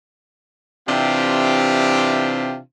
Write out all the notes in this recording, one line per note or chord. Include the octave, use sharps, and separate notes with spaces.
C3 E3 C4 D4 F4 G4